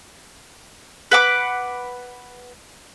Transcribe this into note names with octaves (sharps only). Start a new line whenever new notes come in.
B4 F#5 D6